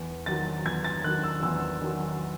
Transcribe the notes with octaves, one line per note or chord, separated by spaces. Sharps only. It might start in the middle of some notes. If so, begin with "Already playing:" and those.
Already playing: E2
D#3 F#3 A6
E2 G#6
A6
D#3 F#3 F#6
E6
E2 E6
D#3 F#3